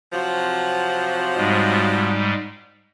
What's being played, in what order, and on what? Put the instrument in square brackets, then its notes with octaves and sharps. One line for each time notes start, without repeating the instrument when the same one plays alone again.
[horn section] C3 F3 F#3
[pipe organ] G#2 G3 G#3